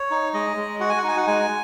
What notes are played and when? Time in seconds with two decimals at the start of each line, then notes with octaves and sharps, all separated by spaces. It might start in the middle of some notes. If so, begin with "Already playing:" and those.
Already playing: C#5
0.11 D#4
0.34 G#3 D#5
0.57 G#3
0.80 F#4 F#5
0.89 G#5
0.98 F#5
1.03 D#4 G#5
1.17 F#5
1.27 G#3 G#5